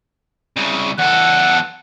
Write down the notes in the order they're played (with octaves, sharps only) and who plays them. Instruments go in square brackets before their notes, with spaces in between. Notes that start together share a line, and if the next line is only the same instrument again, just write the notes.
[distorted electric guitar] C2 C#3
[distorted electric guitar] E2 A4 [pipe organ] F#5